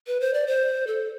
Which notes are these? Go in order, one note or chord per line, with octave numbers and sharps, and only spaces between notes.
B4
C5
D5
C5
A4